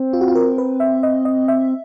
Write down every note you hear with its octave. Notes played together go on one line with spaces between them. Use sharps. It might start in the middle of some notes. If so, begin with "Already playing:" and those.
Already playing: C4
F4
F#4
F4
A#4
B4
E5
D#5
D#5
E5